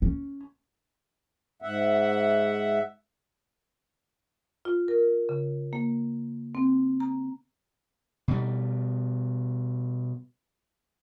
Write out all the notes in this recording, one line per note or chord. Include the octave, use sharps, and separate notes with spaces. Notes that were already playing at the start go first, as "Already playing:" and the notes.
C#4
G#2 E5 F#5
F4
A#4
C#3
A#3
C4
A#5
B2 G3